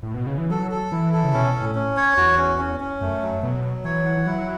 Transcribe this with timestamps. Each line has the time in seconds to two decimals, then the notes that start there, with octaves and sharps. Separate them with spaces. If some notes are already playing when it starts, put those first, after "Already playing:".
0.03 A2
0.14 B2
0.27 C#3
0.38 E3
0.50 F#3 A4
0.71 A4
0.92 E3 E4
1.13 A4
1.23 C#3
1.33 B2 C#4
1.54 C#4
1.62 A2
1.75 C#4
1.97 C#5
2.17 E2 F#4
2.38 C#4
2.59 C#4
2.80 C#4
3.01 F#2 A3
3.22 F#3
3.43 B2 F#3
3.64 F#3
3.84 E3 C#5
4.06 F#5
4.17 E3
4.26 F#3 E4